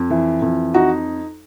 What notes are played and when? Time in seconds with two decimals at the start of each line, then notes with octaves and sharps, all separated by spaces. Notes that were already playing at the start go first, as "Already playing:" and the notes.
Already playing: F2
0.10 E3
0.42 F2
0.74 D#4 F#4